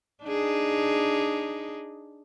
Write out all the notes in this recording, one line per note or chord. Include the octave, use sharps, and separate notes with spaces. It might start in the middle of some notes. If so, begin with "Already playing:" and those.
D4 D#4 G#4